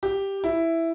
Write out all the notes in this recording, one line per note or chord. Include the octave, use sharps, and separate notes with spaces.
G4
E4